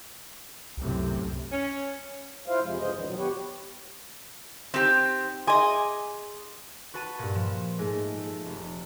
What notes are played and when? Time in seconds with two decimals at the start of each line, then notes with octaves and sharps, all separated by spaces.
0.77 C2 F#2 A2 C3
1.52 C#4
2.48 E4 F4 C5 F5
2.63 F2 C3 F3 G#3
2.79 F#2 E3 G#3 C5 D#5
2.93 D#2 A2 D3 E3
3.05 B2 D#3 F#3
3.17 B3 G4 B4 C#5
4.74 C4 D#4 G4
5.47 G#4 D#5 G#5 C6 D6
6.94 F#4 B4 A5 B5 D#7
7.19 G2 A#2
7.35 F3 E7
7.78 G#2 G#3 A3
8.17 A3
8.46 F1